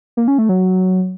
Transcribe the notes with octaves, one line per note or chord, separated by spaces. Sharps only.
A#3
C#4
A3
F#3